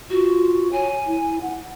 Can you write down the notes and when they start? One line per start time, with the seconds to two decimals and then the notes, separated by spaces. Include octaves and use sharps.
0.10 F4 F#4
0.73 C#5 G#5
1.07 E4
1.42 F#5